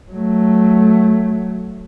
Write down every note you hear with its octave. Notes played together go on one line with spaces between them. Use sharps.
F#3 A3